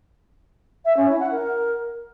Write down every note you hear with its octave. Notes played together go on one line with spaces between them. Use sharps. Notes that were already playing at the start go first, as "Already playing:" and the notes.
E5
C#4
E4
F#5
A#4